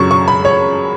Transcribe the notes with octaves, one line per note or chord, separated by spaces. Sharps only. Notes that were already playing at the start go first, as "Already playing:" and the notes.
Already playing: F#2 C#3 F#3 C#6
C#6
B5
C#5